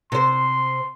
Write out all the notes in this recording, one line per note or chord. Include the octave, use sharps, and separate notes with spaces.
C3 C5 C6